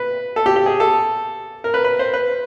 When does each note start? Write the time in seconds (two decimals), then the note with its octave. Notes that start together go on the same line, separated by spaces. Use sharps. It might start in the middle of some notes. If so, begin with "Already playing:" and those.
Already playing: B4
0.36 A4
0.46 G4
0.56 G4
0.66 G#4
0.80 A4
1.64 A#4
1.74 B4
1.84 B4
1.99 C5
2.13 B4